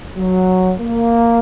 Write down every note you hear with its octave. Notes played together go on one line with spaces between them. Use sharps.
F#3
A#3